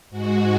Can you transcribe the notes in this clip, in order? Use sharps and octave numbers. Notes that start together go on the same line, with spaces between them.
G#2 G#3 F#4